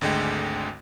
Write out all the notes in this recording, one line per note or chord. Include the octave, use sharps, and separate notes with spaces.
G#1 D2 D3 G#3 G5